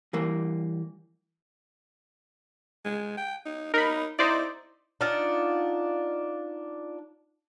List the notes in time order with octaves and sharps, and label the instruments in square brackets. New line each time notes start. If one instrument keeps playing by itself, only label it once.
[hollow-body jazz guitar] E3 G3 A#3
[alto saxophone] G#3
G5
D#4
[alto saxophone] D#4 [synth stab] A#4 B5
[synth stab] D#4 C5 D5 [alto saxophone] E4
[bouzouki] D4 D#4 F4 F#5